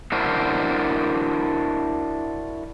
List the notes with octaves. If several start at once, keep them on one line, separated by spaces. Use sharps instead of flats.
D4 E4 F#4 A#4 C5